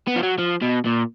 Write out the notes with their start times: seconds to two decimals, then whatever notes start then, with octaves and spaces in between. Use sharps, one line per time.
0.07 B3
0.16 F3
0.23 F#3
0.38 F3
0.62 B2
0.85 A#2